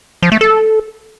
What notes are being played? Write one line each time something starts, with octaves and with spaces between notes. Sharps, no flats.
F3
A3
A4